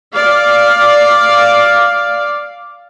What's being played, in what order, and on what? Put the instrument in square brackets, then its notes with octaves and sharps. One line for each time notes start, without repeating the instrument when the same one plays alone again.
[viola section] D5 F5